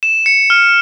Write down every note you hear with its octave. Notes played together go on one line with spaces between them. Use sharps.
E7
C#7
F6